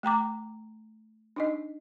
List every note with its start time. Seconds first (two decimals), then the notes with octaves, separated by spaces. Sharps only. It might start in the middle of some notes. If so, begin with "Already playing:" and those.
0.03 A3 G5 A#5 D6
1.36 D4 D#4 D#5